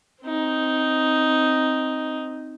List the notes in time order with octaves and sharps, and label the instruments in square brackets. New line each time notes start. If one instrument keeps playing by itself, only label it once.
[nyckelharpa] C4 D#4